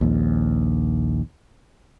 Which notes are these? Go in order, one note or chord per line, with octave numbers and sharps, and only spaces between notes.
A#1 D#2